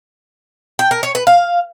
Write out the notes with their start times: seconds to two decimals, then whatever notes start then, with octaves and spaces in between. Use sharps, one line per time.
0.79 G5
0.91 A#4
1.03 C#5
1.15 B4
1.27 F5